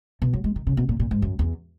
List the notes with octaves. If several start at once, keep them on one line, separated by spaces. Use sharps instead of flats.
B2
F#3
G#3
D#3
C#3
B2
A#2
A#2
G#2
F#2
E2